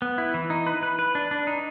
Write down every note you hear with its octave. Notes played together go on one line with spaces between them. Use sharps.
B3
E4
E3
D#4
B4
B4
B4
D4
D4
D#4